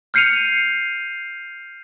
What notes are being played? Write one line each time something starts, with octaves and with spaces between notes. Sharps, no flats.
F6 G6 C7 C#7 D#7 F7